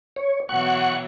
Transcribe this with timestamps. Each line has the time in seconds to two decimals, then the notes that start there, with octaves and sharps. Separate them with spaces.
0.16 C#5
0.49 B2 E3 F#3 F#5 C#6